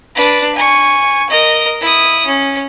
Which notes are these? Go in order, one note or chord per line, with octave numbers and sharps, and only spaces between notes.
D4 B4
G#5 C#6
A#4 D#5
E4 D#6
C#4